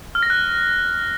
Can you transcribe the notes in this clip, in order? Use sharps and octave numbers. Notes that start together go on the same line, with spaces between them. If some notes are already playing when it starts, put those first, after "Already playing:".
F6
A#6
F#6